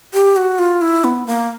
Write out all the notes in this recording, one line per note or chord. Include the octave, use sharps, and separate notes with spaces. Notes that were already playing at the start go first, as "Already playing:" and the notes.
G4
F#4
F4
E4
B3
A#3